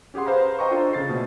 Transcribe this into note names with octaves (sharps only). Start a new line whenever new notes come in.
C#4 G4 G#4 F#5 C6
B4 C5 F5 A#5 B5
C5 D#5 G5 A#5 C6 C#6
D4 F4 A4 C5 D5
C#3 A6 C7
B2 A3